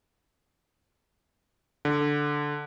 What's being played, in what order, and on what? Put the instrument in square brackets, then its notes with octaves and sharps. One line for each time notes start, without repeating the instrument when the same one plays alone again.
[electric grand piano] D3